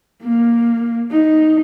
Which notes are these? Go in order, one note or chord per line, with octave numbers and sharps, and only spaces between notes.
A#3
D#4